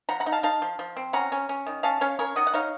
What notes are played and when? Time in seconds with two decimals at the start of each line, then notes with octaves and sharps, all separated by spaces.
0.09 F3 F#5 A#5
0.20 F#5 A#5
0.26 D#4
0.32 F5 A5
0.43 D#4 F5 A5
0.62 F3
0.79 F3
0.97 C4
1.13 C#4 F#5 A#5
1.32 C#4
1.49 C#4
1.67 D#3
1.83 C#4 F5 A5
2.01 C#4 C#5 F5
2.19 C#4 A#4 C#5
2.36 D#3 D#5 F#5
2.47 F#5
2.54 D#4 C#5 F5